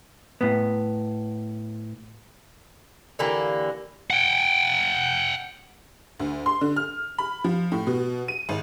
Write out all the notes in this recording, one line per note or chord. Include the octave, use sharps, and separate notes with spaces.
A2 B3
D3 E3 A#3 G4
F#5 G5
D2
C6
D3
F6
B5
F3
A2
B2
D#7
G#1